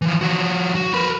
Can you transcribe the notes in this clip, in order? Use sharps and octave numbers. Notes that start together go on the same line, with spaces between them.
E3 F3
F3 F#4
F#4
A#4 B4